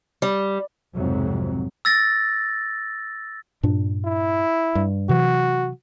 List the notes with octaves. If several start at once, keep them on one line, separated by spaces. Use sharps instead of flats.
G3
B1 F2 G#2 C3 F#3
E6 A6 A#6
G2 A#2 D4
E4
G2
C3 E3 F#3 F#4